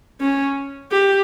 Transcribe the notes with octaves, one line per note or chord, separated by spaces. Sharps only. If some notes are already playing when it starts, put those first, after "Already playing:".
C#4
G4